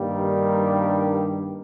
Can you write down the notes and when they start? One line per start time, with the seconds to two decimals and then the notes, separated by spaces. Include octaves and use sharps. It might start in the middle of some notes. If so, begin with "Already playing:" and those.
Already playing: G2 D#3 G3 A#3
0.26 D4